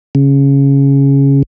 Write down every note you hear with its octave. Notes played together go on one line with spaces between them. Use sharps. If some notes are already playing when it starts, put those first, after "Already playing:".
C#3